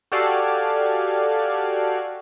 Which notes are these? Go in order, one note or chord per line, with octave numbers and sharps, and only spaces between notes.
F#4 G4 A4 D5 F5 G#5